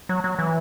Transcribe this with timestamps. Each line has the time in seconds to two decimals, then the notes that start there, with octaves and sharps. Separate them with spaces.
0.09 F#3
0.24 F#3
0.39 E3